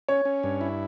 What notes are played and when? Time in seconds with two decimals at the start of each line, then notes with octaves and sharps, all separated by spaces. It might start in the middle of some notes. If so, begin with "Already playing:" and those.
0.08 C#4 C#5
0.25 C#4
0.43 G2
0.61 E4